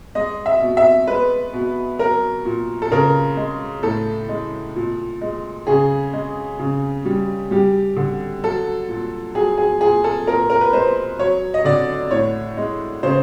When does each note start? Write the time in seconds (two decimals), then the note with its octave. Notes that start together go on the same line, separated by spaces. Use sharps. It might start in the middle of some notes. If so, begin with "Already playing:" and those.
0.15 G#3 D#5
0.46 E5
0.61 B2
0.77 E5
1.07 G#3 B4
1.53 B2
1.99 F#3 A#4
2.45 A#2
2.82 A4
2.91 C#3 A#4
3.37 G#3
3.83 A2 A4
4.29 G#3
4.76 A#2
5.21 G#3
5.67 C#3 G#4
6.13 G#3
6.59 C#3
7.05 G3
7.51 G3 G4
7.97 D3
8.43 F#3 A4
8.89 A#2
9.35 F#3 G#4
9.58 G#4
9.81 A#2 G#4
10.04 A4
10.27 A#2 A#4
10.50 A#4
10.61 B4
10.73 G#3 C5
11.19 F#3 C#5
11.54 D#5
11.65 D3 D5
12.11 A2 C#5
12.57 G#3
13.03 C#3 C5